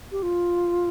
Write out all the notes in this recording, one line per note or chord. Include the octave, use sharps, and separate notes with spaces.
G4
F4